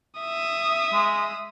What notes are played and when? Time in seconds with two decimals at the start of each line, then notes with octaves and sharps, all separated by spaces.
0.20 E5 D#6
0.93 G#3